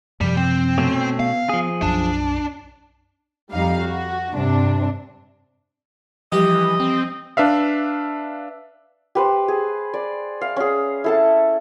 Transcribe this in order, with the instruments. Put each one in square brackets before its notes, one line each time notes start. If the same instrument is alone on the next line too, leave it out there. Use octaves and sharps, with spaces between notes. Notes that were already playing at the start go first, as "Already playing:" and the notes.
[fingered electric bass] F#2 C3 F3 [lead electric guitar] G3
[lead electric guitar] C4
[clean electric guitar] B2 A3 C#4
[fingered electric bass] B3 [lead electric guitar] F5
[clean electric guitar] F3 G#4
[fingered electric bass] B1 F#2 [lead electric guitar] D4
[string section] F2 G3 D#4 F5
F#4
G2 C3 D4
[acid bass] E3 [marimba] F3 G3 [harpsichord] G4 [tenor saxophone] D#5
[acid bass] C4
[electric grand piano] D4 B4 E5 F5
[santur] G4 B4 C5
G#4
D5
F5
C#4 G#4
E4 A4 A5